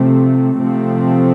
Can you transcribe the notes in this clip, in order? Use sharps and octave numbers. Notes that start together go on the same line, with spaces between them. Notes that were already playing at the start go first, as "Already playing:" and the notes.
Already playing: C3 F3 A3 C4
C3 F3 A3 C4